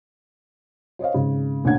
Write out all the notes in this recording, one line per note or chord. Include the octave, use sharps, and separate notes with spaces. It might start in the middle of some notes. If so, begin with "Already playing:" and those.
C5 C#5 D#5 F5
G#1 C#3
D2 A#2 C#4 D4 F#5 G#6